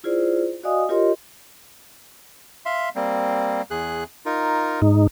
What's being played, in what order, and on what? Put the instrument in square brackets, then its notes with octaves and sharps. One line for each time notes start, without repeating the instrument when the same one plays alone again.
[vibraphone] E4 F4 G#4 C5 D5
F#4 D5 D#5 F5 G#5 D#6
F4 G4 A#4 C#5 D#5 C6
[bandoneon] E5 F5 C6
G3 A#3 C4
E2 G#4 F#6
D#4 F4 A#4
[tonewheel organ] G#2 D#4